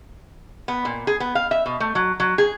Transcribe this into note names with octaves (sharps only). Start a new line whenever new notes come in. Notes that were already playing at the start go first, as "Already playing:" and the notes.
B3
A#2
G#4
B3
F5
E5
B2
A3
F#3
F#3
G#4